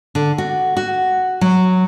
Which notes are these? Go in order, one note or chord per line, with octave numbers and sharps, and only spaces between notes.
D3
F#4
F#4
F#3